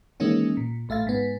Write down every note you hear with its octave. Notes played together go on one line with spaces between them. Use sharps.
D#3 E3 G#3 A#3 C#4 D#4
A#2
A1 A3 E5 F5 A6
G#2 B3